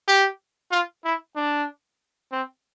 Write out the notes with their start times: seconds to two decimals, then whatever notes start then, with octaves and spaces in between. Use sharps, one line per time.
0.08 G4
0.71 F4
1.05 E4
1.36 D4
2.32 C4